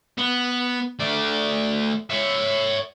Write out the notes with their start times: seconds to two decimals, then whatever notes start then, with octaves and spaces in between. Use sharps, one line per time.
0.18 B3
0.99 A3 D5
2.10 C#5 E5